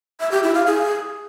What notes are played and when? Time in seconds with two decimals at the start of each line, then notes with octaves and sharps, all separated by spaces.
0.20 E5
0.32 G4
0.43 E4
0.55 F5
0.66 G#4